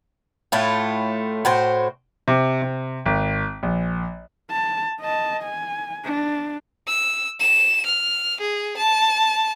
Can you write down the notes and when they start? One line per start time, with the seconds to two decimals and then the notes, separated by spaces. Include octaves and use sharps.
0.52 A2 A3 F4
1.45 A2 F#4 C5
2.28 C3
2.62 C3
3.06 G#1
3.63 A#1
4.51 A5
5.01 D#5 A5
5.44 G#5
6.05 D4
6.88 E6
7.40 E7
7.86 F6
8.40 G#4
8.77 A5